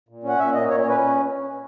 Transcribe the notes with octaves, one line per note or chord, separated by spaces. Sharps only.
A#2
C#4 F#5
A#2 E5
A#3 D#5
A#2 C#5
C#5
C#4 B4